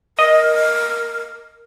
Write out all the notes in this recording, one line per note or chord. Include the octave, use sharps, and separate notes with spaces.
A#4 D#5